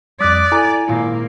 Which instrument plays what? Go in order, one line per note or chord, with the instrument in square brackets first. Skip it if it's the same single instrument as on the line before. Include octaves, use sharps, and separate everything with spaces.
[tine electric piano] F2 G3 [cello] D5 [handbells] D6 D#6 F#6 [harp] B6
[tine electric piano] E4 A4 [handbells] G#5 A#5
[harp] G#1 A#2 D5 [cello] A#3 [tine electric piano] E4